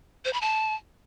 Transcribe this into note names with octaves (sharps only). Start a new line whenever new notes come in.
C5
B5
A5